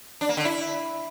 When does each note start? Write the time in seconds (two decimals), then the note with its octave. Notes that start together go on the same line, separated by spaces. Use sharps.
0.21 D4
0.29 A#3
0.37 D3
0.45 E4